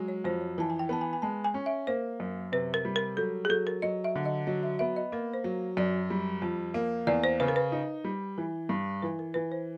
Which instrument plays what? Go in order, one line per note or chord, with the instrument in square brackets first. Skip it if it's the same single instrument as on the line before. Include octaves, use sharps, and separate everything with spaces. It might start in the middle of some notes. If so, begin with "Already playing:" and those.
Already playing: [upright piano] F#3 G#3
[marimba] C#5
[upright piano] F2 [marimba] C5
[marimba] C#5
[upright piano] E3 [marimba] A5
[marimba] G#5
G5
[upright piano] B3 [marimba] A5
[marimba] G#5
G#5
[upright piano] G#3 [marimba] A5
[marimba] G#5
[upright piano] C#4
[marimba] E5
[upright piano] A#3 [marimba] C5
[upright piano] F#2
[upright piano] C3 [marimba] B4
[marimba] A#4
[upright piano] G3
[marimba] A#4
[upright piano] F#3 [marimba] A4
[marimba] G#4
[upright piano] F#3 [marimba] A4
[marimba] A#4
[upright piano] F#3 [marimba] D#5
[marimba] E5
[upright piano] D3
[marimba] D#5
[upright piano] F#3 [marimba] D#5
[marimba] E5
[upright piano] B3 [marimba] E5
[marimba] D#5
[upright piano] A#3 [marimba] A#4
[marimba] C5
[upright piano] F#3
[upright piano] F#2 [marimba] D5
[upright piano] G3
F2
A#3
[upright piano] E2 [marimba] D5
[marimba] C5
[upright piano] C#3 [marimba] B4
[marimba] A#4
B4
[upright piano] D#4
G3
E3
G2
[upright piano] E3 [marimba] B4
[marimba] A#4
[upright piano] E3 [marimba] B4
[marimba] C5